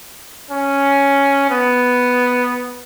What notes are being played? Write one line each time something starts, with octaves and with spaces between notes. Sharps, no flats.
C#4
B3